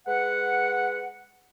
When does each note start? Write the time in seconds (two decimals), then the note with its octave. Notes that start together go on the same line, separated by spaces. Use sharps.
0.06 G#3 B4 F#5